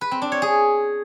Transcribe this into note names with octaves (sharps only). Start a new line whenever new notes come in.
B4
C4
D4
C#5
G#4